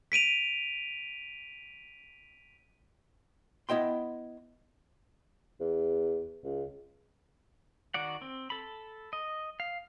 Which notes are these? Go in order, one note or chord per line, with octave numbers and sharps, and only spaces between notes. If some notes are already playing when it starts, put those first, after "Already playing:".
B6 D7 D#7 F7
B3 E4 D#5 G5 C6
E2
C#2
D#3 F#4 D5 F#5
C4
A4 B5
D#5
F5